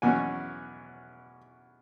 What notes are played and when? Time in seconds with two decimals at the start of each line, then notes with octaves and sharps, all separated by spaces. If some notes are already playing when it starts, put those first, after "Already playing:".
0.02 E2 B2 F#3 C#4 G#5